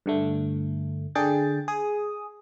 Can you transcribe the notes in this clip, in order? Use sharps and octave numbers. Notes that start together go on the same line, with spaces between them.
G2 D3 A3
D3 D4 G#4 G5 A6
G#4 D#6